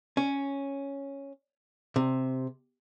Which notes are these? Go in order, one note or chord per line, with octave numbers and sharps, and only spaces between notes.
C#4
C3